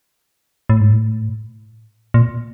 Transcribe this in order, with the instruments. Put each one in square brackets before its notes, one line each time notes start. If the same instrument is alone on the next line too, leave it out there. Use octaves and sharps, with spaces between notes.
[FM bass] A2
G#2
A2
A#2